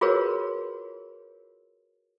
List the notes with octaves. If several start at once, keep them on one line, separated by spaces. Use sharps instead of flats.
F4 F#4 G#4 A#4 B4 C#5